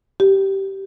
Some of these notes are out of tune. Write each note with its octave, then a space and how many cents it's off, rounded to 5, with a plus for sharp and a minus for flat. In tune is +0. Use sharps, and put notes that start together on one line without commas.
G4 -15